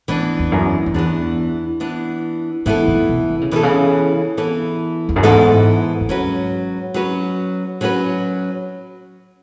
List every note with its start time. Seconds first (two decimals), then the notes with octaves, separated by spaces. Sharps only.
0.08 A2 E3 B3 D4
0.39 E2
0.52 F#2
0.86 F#2
0.94 E2 E3 B3 D4
1.80 E3 B3 D4
2.66 G#2 E3 B3 E4 A4
2.87 A2
3.09 B2
3.30 D3
3.41 C#3
3.51 B2 E3 B3 E4 A4
3.63 C#3
4.37 E3 B3 E4 A4
5.09 E2
5.16 F#2
5.23 G#2 E3 B3 E4 A4
6.01 F#2
6.09 G#2 F#3 C#4 F#4 B4
6.94 F#3 C#4 F#4 B4
7.81 F#3 C#4 F#4 B4